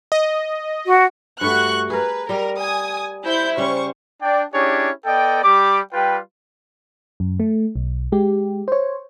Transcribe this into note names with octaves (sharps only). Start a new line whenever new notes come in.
D#5
F#4
G2 A3 F#4 C#6 F#6
G#4 A#4 B4
G3 A#4 D#5
G#5 D#6
E4 C5 G6
C#3 G3 C#4 C5 C#6
D4 D5 G5
C#4 D4 E4 G4 G#4 C#5
B3 A4 D5 D#5 G5
G3 G4 B5 D6
G3 F4 G4 B4 G5
F#2
A3
B1
G#3 G4
C5 C#5